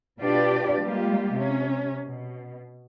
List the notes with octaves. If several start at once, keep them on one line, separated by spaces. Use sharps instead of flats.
B2 D4 F4 G4 B4 D5
G3 G#3 A#3 F4 G4
C3 C#4
B2